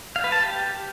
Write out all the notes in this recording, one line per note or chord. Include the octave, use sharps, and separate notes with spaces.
F5
B4
A5
G4